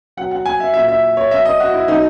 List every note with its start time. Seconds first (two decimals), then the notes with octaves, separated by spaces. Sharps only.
0.17 B2 F#3 F#5
0.31 F#5
0.46 G#5
0.60 E5
0.74 A#2 F#3 E5
0.88 E5
1.17 C#5
1.31 B2 F#3 E5
1.45 D#5
1.60 F#4
1.74 E4
1.88 B2 F#3 D#4